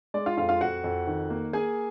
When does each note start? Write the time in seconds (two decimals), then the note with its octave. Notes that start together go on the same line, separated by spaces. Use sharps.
0.14 G#3 D5
0.26 F4 F5
0.37 F2 F4 F5
0.49 F4 F5
0.61 F2 F#4 F#5
0.84 F2
1.07 D#3
1.30 A#3
1.53 A#3 G#4 G#5